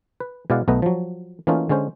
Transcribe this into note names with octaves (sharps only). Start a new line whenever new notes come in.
B4
B2 G#3 E4 D5 F5 F#5
B1 A3 B3 D#4 B4 A#5
F3 F#3
E3 A3 A#3 C#4 D#4 F4
D3 G#3 C#4 C5